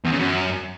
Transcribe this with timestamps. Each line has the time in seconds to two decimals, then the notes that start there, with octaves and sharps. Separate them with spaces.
0.04 E2
0.12 C#3
0.19 F#2